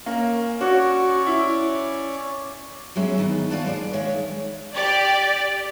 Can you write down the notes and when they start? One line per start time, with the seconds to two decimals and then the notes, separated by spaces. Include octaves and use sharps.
0.06 A#3 C#4
0.61 C#4 F#4 C#5 D5
1.27 E4
2.96 F#3 G#3 B3 C#4 G#4 E5
3.18 D#3 B3 D#4
3.50 B4 C#5 D5 F5 F#5 A5
3.65 G#3 G#4 D5
3.93 D#3 G#3 C#5 E5 F5
4.74 G4 D5